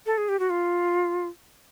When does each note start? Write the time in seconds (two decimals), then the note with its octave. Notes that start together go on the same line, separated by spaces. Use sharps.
0.06 A4
0.18 G#4
0.29 G4
0.39 F#4
0.50 F4